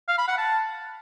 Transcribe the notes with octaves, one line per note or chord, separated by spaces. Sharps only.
F5
B5
F#5
A5